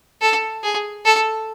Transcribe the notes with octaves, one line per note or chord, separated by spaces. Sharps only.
A4
G#4
A4